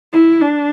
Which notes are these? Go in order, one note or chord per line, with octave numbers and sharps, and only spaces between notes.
E4
D4